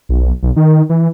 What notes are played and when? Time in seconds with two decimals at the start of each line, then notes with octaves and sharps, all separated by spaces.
0.09 B1
0.43 B1
0.56 D#3
0.89 E3